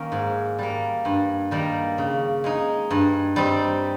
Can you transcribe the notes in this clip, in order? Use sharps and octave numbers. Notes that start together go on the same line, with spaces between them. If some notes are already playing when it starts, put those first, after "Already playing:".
Already playing: D#3 A#3 C#4
G#2
G3 A#3
G2
D#3 G3 A#3
C#3
G#3 D#4
G2
G3 C4 D#4